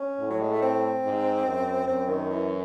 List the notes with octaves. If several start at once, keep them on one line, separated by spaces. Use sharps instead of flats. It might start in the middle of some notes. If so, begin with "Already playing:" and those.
Already playing: C#4
A2
F#3
G#3
A3
C4
G#2
F#2
F#2 C4
D#3
E3